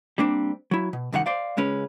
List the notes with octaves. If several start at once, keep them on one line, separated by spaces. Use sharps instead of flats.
G3 A#3 C4 D4
F#3 E4
B2
C2 F#2 D#3 G3 F5 F#5
C5 D5 F5
C#2 G#3 C#4 B4